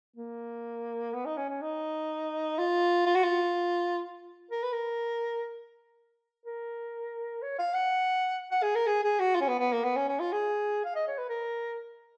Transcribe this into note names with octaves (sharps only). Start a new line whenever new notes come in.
A#3
B3
D#4
C#4
C#4
D#4
F4
F4
F#4
F4
A#4
B4
A#4
A#4
C#5
F5
F#5
F#5
G#4
A#4
G#4
G#4
F#4
F4
C#4
B3
B3
A#3
B3
C#4
C#4
F4
G#4
F5
D#5
C#5
B4
A#4